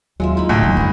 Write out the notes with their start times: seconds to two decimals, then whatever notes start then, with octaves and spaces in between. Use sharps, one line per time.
0.20 D#2 F#3 G#3 F4 E5
0.37 D#4 E4 B5
0.49 D2 A2
0.63 E2 F#3 A#3
0.77 G2 G#4 B4